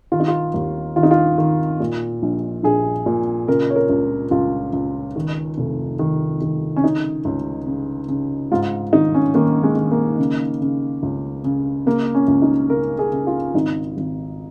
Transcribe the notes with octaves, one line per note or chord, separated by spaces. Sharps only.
D#3 F4
D#4
F4
D#2
D#3 F4
D#4
F4
D#3
A#2
A#1
A#1 G#4
A#2
C#3 A#4
C#5
A#4
C#2
C#2 F4
C#2
D#3
F1
D#3
D#3
C#4
C#3 D#4
C#2
C#3
C#3
G#2 F4
D#3 D#4
C#4
D#3 A#3
G#3
D#3
A#3
C#3
C#3
C#2
C#3
C#3 A#3
C#4
C#2
D#4
C#3 A#4
G#4
C#3
F4
G#1 D#4
G#1